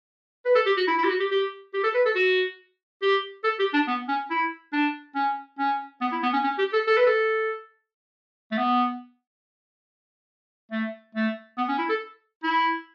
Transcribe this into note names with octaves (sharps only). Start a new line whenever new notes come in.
B4
A4
G4
F#4
E4
E4
G4
F#4
G4
G4
G4
A4
B4
A4
F#4
G4
A4
G4
D4
B3
C#4
E4
D4
C#4
C#4
B3
E4
B3
C#4
C#4
G4
A4
A4
B4
A4
A3
B3
A3
A3
B3
C#4
E4
A4
E4